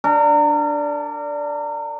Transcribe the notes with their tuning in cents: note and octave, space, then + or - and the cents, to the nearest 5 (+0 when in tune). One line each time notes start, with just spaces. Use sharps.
D4 -5 A#4 -35